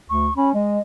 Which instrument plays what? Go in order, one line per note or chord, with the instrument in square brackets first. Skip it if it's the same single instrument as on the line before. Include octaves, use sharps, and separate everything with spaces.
[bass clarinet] D2 [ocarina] C#6
[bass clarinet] C#4 [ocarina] B5
[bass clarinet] G#3 [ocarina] D#5